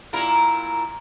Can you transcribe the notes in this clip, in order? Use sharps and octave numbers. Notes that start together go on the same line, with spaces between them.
A#2 E4 A#4